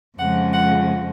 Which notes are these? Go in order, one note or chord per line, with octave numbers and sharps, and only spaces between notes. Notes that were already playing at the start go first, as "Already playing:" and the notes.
F2 C#3 F3 G#3 F#5
F#5